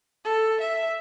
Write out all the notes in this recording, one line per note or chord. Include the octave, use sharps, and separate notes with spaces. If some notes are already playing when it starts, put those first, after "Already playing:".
A4
E5